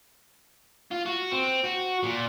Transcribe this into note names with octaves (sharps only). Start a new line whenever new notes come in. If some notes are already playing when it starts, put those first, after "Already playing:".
F4
F#4
C4
F#4
A#2